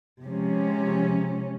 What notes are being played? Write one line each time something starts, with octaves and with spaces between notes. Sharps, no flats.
C3 F3 G#3 C#4